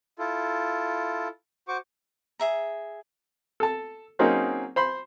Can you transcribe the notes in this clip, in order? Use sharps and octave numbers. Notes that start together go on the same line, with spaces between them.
E4 F4 A4
F#4 C5 C#6 D6
G#4 E5 A#5
A4 A5
F#3 A#3 C4 C#4 D#4 G#4
C5 B5 C6